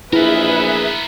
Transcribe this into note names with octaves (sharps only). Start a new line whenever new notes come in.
A#1 B3 E4 G#4 A#4 B4 E5